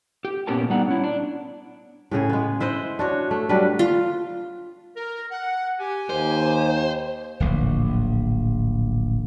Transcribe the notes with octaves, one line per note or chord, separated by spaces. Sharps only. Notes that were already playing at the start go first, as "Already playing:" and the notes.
G4
A#2 B3 C#4 G4 A#4 A5
G3 B3 D4 D#4 F#5
C#4 E4
D4
A2 C#3 G#4 C#5
G#3 B3
E4 C5 D#5 F#5
D4 F#4 C#5
A3
F#3 G3 D4 B4
F4
A#4
F#5
G4 G#5
D#2 C5
D1 A#1